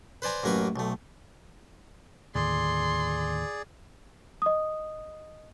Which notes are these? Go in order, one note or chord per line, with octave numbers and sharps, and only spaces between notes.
B4 C5 D5 G#5 A#5
A1 F#2 A#3 A#4 B4 C#6
B1 A3
D#2 A2 D3 G#4 D5 C6
D#5 D#6